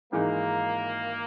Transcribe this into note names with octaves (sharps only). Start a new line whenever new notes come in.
G#1 G#2 E3 G#3 A#3 D#4